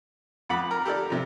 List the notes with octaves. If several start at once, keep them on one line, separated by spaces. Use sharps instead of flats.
F2 F#5 B5 D6
A#4
G4 A4 A#4 D5
C3 F3